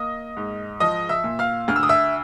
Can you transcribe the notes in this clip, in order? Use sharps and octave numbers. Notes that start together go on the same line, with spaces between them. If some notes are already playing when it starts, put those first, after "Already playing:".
Already playing: A#3 D#5 D#6
G#2
F3 D#5 D#6
E5 E6
A#2
F5 F6
D2 F6
E6
D#6
E5 E6